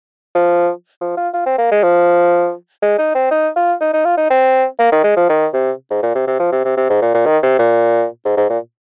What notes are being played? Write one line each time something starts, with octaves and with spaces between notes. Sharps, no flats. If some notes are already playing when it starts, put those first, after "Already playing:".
F3
F3
F4
F4
C4
A#3
G#3
F3
G#3
D#4
C4
D#4
F4
D#4
D#4
F4
D#4
C4
A#3
D#3
G#3
F3
D#3
C3
G#2
A#2
C3
C3
F3
C3
C3
C3
G#2
A#2
A#2
D#3
C3
A#2
G#2
G#2
A#2